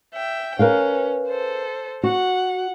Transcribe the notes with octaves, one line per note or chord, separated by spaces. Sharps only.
E5 G5
C#4 A#4 B4 F5
A4 C5
F#4 F#5